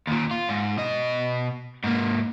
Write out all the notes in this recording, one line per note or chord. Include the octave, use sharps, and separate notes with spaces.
D#2 A#2
F4
G#2
B2 D#5
G#2 A#3